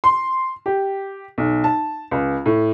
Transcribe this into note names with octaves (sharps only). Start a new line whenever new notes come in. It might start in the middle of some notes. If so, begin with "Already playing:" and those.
C6
G4
B1
A5
C#2
A2